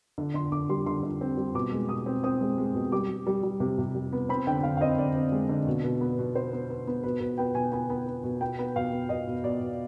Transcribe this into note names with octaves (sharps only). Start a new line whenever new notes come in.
D3
D3 C6
D3 D6
G3 C6
D3 C6
D3
C4
G3
B2 D6
G#3
B2 D#6
C4
C4 D#6
G#3
G#3
B2
G3 D6
G3
G3
G3
C3
C3
G3
B3
C4 B5
D3 G5
D3 F5
F5
C4 D#5
D3 D5
C4
G#3
D3
B2
B2
B3
B2
B3 C5
B3
B3
B3
B2 B4
B2 B4
B3 G5
B2 G#5
B3 G#5
B3
B3
B2
B3 G5
B3
B2 F5
B3
B2 D#5
B2
B2 D5
B2